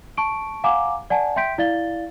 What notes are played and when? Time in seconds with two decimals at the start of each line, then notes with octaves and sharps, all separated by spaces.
0.17 A5 C#6 D7
0.64 F5 F#5 G#5 A#5 D6
1.10 D5 F#5 G#5 A5
1.36 E5 G5 C6 G6 B6 D7
1.58 E4 D5 F5 A6 G7